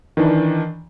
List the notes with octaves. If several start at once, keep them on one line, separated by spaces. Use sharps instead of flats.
D#3 E3 D4